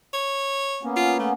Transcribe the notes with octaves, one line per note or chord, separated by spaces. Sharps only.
C#5
A#3 B3 C#4
F4
A3